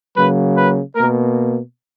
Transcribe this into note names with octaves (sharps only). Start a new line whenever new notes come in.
C#3 F#3 A#3 B4
B4
B2 A#3 A#4